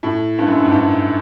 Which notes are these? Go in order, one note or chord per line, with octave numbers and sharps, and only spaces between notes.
A2
G2
F#2
G2
G#2
G2